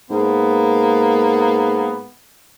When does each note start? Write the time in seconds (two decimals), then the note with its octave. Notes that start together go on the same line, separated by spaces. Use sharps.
0.10 G#2 A#3 B3